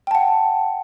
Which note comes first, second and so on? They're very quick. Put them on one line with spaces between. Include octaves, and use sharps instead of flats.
G5 A5 F#5